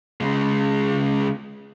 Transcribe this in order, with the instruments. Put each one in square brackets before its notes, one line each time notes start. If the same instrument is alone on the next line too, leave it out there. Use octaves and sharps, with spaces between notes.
[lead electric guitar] C#3 G#3